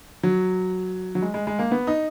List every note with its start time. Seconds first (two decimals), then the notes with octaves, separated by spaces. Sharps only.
0.23 F#3
1.15 F#3
1.22 G#3
1.34 G#3
1.47 G#3
1.59 A#3
1.71 B3
1.87 D#4